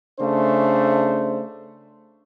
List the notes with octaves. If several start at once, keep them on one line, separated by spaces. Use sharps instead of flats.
C#3 A3 D4 C5